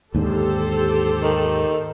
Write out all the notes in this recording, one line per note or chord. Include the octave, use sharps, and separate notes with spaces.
D#2 G#2 D3 G4 A4 C5
D#3